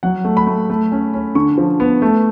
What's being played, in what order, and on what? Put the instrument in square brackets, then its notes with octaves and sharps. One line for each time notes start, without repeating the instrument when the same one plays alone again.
[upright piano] F#3 F#5
A3
B5
A3
A3
C#4
C#4
D3 C#6
F3
B3
A3